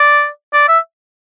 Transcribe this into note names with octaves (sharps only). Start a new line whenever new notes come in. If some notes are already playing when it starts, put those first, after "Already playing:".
Already playing: D5
D5
E5